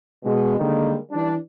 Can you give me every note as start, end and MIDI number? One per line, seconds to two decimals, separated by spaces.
0.24 0.57 47
0.24 0.57 56
0.57 0.96 50
0.57 0.96 51
0.57 0.96 55
0.57 0.96 56
0.57 0.96 58
1.11 1.33 52
1.11 1.33 55
1.11 1.33 62